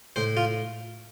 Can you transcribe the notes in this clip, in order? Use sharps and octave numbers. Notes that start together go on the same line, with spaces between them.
A2 C5
F4